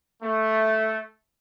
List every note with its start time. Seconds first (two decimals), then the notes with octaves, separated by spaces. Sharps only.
0.23 A3